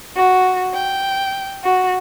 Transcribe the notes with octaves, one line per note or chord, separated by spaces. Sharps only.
F#4
G5
F#4